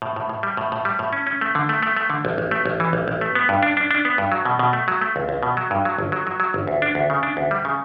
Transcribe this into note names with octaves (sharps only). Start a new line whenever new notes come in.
A2
A2
A2
G3
A2
A2
G3
A2
C#4
C#4
A3
D3
A3
A3
A3
D3
A1
A1
A3
A1
E3
A1
A1
A3
B3
G2
D4
D4
D4
B3
G2
F#3
B2
B2
A3
F#3
A3
C#2
C#2
B2
F#3
G2
F#3
G1
F#3
F#3
F#3
G1
D2
D4
D2
C#3
D4
D2
G3
C#3